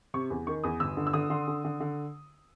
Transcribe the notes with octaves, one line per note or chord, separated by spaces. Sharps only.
C3 C#6
E2
D#3 C#6
E2 D#6
G1 E6
D3
E6
D3 D#6
D3 C6
D3
D3
D3